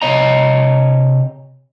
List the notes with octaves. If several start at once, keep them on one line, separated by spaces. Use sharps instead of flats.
C3 C#5 D#5 A#5